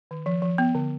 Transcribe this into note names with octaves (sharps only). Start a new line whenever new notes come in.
D#3
F3
F3
B3
D3